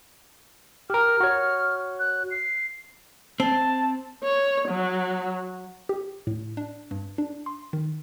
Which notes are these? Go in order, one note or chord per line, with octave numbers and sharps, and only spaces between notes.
G4 A#4 F6
F#4 C#5
F#6
C7
C4 A5
C#5
F#3
G4
A2
D4
G2
D4
C6
D#3